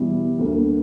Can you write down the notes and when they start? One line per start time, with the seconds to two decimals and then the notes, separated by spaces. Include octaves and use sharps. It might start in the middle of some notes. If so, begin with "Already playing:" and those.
Already playing: E2 B2 G3 B3 E4
0.39 D2 D3 A#3